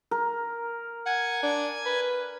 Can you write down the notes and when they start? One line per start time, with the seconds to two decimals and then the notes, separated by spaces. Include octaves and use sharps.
0.11 A#4
1.06 F#5 G#5 G#6
1.43 D4
1.86 B4